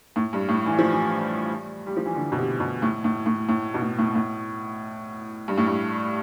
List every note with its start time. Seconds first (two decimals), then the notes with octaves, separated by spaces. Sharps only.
0.16 A2
0.33 G2
0.49 A2
0.66 E3
0.79 F3
0.92 E3
1.87 G3
1.96 F3
2.06 E3
2.15 D3
2.32 B2
2.37 C3
2.60 B2
2.82 A2
3.04 A2
3.26 A2
3.49 A2
3.74 B2
3.81 A2
3.99 A2
4.15 A2
5.48 G2
5.58 A2
5.67 G2